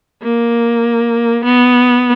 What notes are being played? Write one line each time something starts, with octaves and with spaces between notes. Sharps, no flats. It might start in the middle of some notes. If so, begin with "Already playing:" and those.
A#3
B3